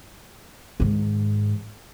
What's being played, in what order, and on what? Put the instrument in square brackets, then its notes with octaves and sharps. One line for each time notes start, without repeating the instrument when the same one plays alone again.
[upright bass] G#2 D#3